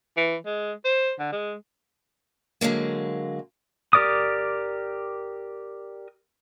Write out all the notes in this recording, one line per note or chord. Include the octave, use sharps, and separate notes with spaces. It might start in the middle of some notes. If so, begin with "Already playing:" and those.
E3
G#3
C5
D3
G#3
D3 F#3 G#3 A#3
G4 A#4 D5 D6 D#6